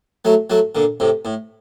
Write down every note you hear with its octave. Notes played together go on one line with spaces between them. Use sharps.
F#3 A3
F#3 A3
A#2 D3
A2 C3
A2